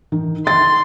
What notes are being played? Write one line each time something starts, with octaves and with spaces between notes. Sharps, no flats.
D#3
C6 A6